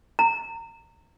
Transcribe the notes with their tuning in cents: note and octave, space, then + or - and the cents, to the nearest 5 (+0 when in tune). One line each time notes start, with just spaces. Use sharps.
A#5 -25